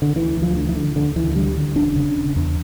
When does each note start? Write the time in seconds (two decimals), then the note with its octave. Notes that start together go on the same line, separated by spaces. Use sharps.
0.02 D3
0.16 D2 E3
0.36 D2
0.42 F3
0.56 D3
0.69 E3
0.75 D3
0.96 D2 D3
1.16 D2 E3
1.36 D3 G3
1.56 D3
1.76 E1 D4
1.96 C#3
2.16 E1
2.36 E2